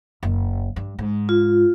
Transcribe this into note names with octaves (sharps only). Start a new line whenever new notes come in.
F#1
G2
G#2
F4